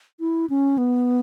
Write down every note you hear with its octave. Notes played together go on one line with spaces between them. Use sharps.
E4
C#4
B3